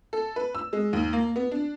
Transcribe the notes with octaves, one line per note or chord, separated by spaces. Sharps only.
A4
B4
E6
G#3
D#2
A#3
B3
D4